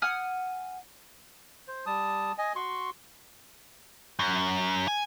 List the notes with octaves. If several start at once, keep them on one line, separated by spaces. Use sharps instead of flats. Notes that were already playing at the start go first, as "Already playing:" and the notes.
F#5 G#5 D#6 F6
C5
G3 A5 D#6
D#5 G#5
F#4 C6 C#6
F#2
G#5